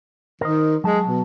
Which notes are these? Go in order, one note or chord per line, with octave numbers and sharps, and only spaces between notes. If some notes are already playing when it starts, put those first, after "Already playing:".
D#3 A#4 C5 D#5
F#3 G#3 A5
B2